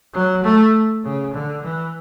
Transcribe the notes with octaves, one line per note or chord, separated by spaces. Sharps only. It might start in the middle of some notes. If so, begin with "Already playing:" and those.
F#3
A3
C#3
D3
E3